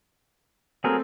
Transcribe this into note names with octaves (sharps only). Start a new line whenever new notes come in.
F#3 A3 C4 G#4 A#4